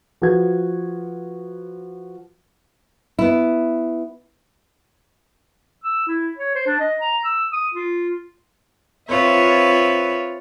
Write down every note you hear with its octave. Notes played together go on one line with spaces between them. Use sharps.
F3 F#4 B4 G#6
B3 E4
E6
E4
C#5
C5
D4
D#5
A#5
E6
D#6
F4
C4 F4 B4 C#5 E5